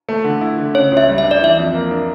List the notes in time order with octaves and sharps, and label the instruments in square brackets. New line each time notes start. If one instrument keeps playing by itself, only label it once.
[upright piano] A3
D3
E4
D3
[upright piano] C#3 [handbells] C#5
[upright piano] C#2
[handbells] E5
[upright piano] G3
[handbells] E5
[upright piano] D4
[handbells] D5
[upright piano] E3 [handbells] E5
[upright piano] F2
A#3
D4